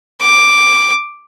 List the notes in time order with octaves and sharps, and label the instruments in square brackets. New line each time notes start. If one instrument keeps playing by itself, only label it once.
[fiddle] D6